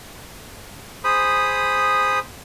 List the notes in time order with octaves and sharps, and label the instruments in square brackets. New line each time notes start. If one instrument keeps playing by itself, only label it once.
[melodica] G#4 C5 B5 D#6